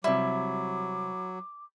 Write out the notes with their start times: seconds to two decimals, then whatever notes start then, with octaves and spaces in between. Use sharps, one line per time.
0.04 C3 F#3 G3 E4 D6